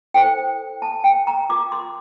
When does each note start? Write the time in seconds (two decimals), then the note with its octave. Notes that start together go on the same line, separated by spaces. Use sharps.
0.14 E4 A4 C5 G5
0.82 A5
1.04 G5
1.27 A#5
1.49 F4 A#4 D6
1.72 C6